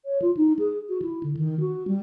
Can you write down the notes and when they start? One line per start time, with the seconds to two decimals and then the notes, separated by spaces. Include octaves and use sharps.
0.05 C#5
0.22 F4
0.37 D#4
0.59 G#4
0.89 F#4
1.02 E4
1.23 D3
1.37 D#3
1.60 F#4
1.88 G3